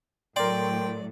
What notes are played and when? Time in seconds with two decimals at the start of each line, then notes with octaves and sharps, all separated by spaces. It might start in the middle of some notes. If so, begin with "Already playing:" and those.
0.36 A2 F#3 A#4 D5 G5 C6